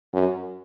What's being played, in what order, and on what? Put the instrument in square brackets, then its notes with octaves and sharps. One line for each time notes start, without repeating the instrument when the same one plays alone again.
[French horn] F#2